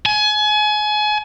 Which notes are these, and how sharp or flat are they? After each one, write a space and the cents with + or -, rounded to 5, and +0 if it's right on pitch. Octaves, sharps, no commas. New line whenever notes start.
G#5 +30